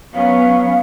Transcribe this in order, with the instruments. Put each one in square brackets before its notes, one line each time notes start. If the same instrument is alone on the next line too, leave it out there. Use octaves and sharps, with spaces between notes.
[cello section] F#3 B3 C#4 [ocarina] F5